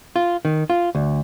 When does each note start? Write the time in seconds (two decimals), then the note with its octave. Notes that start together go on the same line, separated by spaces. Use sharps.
0.16 F4
0.45 D#3
0.70 F4
0.95 D2